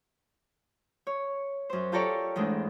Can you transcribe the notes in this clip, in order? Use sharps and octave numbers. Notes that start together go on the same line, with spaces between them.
C#5
F#2 C5
F4 G4 A4 A#4 C#5 D5
E2 G#2 G#3 A3 D4